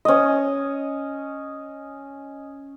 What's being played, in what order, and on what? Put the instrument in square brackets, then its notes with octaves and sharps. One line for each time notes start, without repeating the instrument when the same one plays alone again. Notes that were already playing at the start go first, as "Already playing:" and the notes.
[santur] C#4 D#5